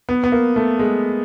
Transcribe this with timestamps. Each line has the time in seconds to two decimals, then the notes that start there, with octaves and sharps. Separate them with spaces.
0.09 B3
0.24 B3
0.32 A#3
0.56 A3
0.79 G#3